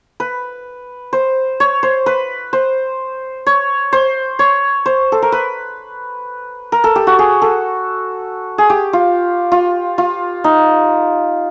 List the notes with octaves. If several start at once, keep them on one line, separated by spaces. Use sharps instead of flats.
B4
C5
C#5
C5
B4
C5
C#5
C5
C#5
C5
A4
A#4
B4
A#4
A4
G4
F#4
G#4
A4
G#4
G4
F4
F4
F4
D#4